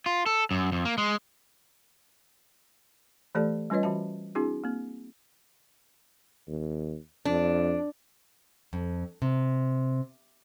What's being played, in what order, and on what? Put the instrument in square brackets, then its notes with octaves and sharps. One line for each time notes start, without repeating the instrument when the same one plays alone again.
[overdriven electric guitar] F4
A4
F#2
F2
A#3
G#3
[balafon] E3 A3 G4 A4 D5 A5
G3 C#4 F4 B4 C#5 D#5
E3 F#4 E5 A5
C4 D4 E4 F#4 G#4
A#3 C4
[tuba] D#2
[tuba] F2 [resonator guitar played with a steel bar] D4
[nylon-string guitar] F2
C3